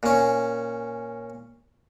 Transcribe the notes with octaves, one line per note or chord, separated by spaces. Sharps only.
A#2 C#4